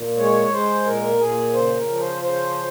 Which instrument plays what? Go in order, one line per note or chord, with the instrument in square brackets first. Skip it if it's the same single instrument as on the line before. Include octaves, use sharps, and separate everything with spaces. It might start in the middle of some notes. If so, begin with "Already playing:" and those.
Already playing: [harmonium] A#2
G#3 C#5
G#3 C5
A#2 A#4
A#2 G#4
C#3 C5
A#4
F3
C5
C#3 C5